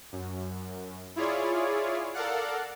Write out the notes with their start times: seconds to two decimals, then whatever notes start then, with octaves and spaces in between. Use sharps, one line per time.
0.12 F#2
1.16 E4 F4 G#4 C#5 D5
2.14 A4 A#4 D5 F5 F#5